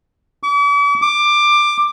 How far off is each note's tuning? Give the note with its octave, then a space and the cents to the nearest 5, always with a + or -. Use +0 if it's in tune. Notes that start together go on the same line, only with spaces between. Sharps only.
D6 -45
D6 +15